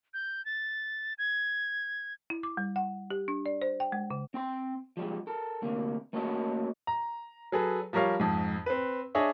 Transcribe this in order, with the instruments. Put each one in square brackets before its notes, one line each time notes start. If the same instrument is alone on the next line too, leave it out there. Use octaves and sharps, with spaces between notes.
[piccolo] G6
A6
G#6
[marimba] E4
D6
G3
F#5
G4
D4
D5
C5
G5
G#3
C#3
[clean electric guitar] C4 G5 C6
F3 G3 G#3
A4 A#4
D2 C3 A#3
A3 A#3 C#4 F#4 A4 D#5
[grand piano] A#5
F#3 G#4 A4 B4
F3 G3 A#4 C#5 F5
F2 G#2
C4 B4
D4 G#4 C#5 D#5 E5